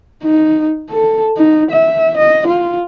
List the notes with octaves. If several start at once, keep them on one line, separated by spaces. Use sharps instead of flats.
D#4
A4
D#4
E5
D#5
F4